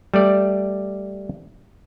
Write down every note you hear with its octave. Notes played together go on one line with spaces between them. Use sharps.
G3 A3 D5